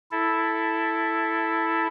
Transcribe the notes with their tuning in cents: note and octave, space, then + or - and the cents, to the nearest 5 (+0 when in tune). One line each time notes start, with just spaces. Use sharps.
E4 +0 A4 +0